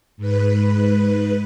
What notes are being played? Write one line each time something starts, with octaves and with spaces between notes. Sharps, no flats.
G#2 B4